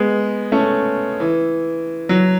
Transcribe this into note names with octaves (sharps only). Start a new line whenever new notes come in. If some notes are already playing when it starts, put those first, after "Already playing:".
Already playing: G#3 B3
A3 C#4
E3
F#3